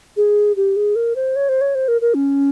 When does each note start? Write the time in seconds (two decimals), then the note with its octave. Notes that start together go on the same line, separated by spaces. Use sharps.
0.17 G#4
0.57 G4
0.76 G#4
0.96 A#4
1.16 C5
1.36 C#5
1.49 C5
1.61 C#5
1.75 C5
1.88 A#4
2.01 A#4
2.14 C#4